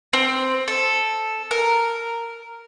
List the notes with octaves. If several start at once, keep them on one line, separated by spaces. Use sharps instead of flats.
C4
A4
A#4